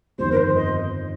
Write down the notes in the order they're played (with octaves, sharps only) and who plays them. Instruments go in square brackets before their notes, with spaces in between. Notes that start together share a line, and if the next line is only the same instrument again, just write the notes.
[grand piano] G1 F2 D#3 [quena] C5
[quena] A#4
C5
D#5